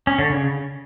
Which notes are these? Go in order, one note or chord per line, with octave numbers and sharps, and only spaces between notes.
C#4
D3
C#3